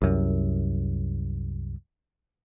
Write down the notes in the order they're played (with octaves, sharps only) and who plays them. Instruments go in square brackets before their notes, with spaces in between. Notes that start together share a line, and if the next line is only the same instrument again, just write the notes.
[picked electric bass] C2 F#2